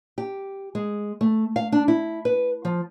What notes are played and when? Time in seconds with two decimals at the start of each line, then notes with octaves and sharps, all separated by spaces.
0.18 G4
0.75 G#3
1.21 A3
1.56 F5
1.72 D4
1.88 E4
2.25 B4
2.65 F3